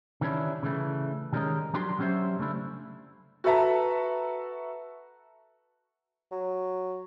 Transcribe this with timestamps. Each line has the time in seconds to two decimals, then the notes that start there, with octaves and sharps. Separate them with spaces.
0.21 D#3 E3 G3 C#4 D4 E4
0.63 C#3 E3 A3
1.33 D#3 G3 G#3 C#4 A#4 D#5
1.74 F3 F#3 D4 G4 C6
1.99 F#3 G3 C#4 G4 C5 E5
2.39 C#3 A3 D4 E4
3.44 F#4 A4 B4 E5 A5 A#5
6.32 F#3